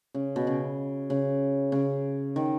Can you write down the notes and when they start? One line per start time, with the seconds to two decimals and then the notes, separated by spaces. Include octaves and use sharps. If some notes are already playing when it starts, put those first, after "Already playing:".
0.14 C#3
0.36 B2
0.47 C#3
1.10 C#3
1.72 C#3
2.36 D#3